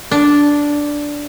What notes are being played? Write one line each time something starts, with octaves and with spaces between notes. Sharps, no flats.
D4